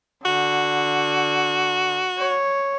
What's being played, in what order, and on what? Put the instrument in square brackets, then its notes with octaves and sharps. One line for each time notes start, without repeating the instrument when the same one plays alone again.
[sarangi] D3 [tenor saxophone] F#4
[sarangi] C#5